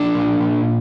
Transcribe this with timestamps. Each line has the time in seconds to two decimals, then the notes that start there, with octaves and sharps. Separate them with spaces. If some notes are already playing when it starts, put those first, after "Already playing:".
Already playing: F3 D4
0.15 A#2
0.40 A#2